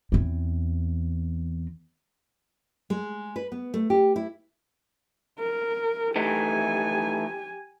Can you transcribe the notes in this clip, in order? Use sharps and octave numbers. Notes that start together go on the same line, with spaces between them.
E2 C4
G#3
B4
B3
A3
G4
E4
A#4
E3 A3 D#4 G4 G#5